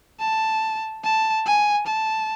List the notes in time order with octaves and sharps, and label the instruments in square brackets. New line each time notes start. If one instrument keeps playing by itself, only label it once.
[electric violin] A5
A5
G#5
A5